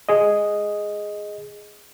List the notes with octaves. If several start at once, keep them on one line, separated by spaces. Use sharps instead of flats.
G#4 D#5